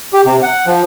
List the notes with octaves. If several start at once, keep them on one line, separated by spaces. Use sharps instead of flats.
G4
C3
F#5
F3